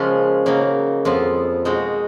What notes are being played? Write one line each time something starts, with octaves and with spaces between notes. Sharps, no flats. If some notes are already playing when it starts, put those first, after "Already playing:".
Already playing: C#3 F3 G#3 A#3 C#4 F4
C#3 F#3 A#3 D#4
F2 F3 B3 F4
B2 G#3 D#4 F#4